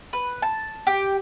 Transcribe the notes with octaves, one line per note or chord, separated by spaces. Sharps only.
B4
A5
G4